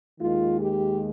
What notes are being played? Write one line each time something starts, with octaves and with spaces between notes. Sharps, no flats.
D#2 D#3 G#3 F4
G4